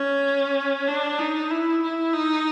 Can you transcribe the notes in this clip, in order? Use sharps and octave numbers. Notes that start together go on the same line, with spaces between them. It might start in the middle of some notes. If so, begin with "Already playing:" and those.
Already playing: C#4
D4
D#4
E4
E4
D#4